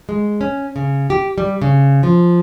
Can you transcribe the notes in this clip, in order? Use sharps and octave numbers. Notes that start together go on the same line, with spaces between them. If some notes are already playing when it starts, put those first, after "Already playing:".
G#3
C#4
C#3
G4
G3
C#3
F3